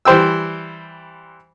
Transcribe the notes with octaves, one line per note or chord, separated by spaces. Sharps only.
E3 G3 C5 G5 E6